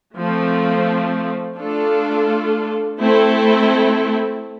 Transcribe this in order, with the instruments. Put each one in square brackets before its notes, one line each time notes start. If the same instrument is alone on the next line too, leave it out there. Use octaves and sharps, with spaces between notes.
[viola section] F3 A3 C4
A3 D4 F4 A4
A3 C4 E4 A4